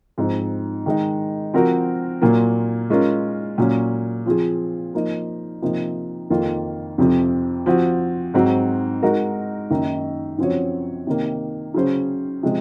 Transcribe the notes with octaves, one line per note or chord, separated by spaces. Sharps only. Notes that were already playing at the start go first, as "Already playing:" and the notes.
G#2 F3 C4 D#4
D#3 G#3 D#4
F3 C4 F#4 A#4
A#2 F#3 A#3 F4
G#3 C#4 F4 A#4
A#2 F#3 C#4
F3 C4 F4 G#4
F3 A#3 D#4
C3 F3 A#3 D#4
F2 D#3 A#3 F4
F2 C3 F3 C4
F3 C4 F#4
G#2 F#3 C4 F#4
G#3 D#4 F#4 A#4
F#2 D#3 A#3 D#4
F#2 F3 C4 F#4 C#5
C3 D#3 A#3
C#3 F#3 C#4 G#4 C5
C3 F3 G#3